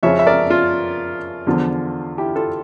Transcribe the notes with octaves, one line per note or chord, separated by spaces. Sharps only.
F2 C#3 F3 C#4 C#5 E5
E5
A#4 D5
F4
E2 D3 F3
E4 G4
F4 A4